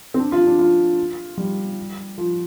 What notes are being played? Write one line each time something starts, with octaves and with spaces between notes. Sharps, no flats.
C4
D4
F4
D4
F4
G3
F3